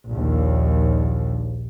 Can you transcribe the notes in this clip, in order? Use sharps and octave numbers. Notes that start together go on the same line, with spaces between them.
A#1 D#2